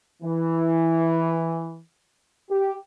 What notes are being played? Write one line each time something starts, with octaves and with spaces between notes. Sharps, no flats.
E3
G4